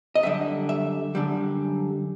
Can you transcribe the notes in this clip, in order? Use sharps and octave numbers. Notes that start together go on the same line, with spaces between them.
D#5
F#2 D3 G3 E5
E5
F#2 D3 G3